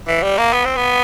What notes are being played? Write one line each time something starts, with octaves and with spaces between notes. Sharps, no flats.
E3
G3
A#3
B3
C4
B3